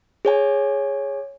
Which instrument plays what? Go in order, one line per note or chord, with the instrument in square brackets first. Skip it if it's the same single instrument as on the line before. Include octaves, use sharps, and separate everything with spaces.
[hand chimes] G#4 C#5 G#5